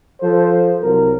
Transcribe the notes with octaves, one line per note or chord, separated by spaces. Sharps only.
F3 A4 C5
C2 F#3 C4 A#4